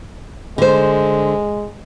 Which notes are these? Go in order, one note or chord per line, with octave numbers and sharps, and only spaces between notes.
D3 G#3 C5